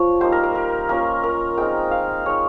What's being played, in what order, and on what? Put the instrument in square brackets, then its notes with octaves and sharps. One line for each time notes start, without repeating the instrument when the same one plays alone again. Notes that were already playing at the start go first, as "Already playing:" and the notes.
Already playing: [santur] F3 C#5
G3 A#3 D#4 C5
A#4
A#4
A#4
A#3 C#4 F4 A#4
A#4
G#3 C4 D#4 G5
F5
G#3 D#4 C#5